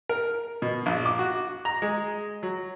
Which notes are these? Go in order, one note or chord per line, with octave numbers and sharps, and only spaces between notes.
A#4
B2
A#1
D6
F#4
A#5
G#3
F#3